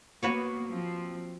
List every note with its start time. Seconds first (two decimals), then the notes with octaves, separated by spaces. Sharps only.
0.23 A#3 B3 F#4 B4 C#5
0.69 F3 C4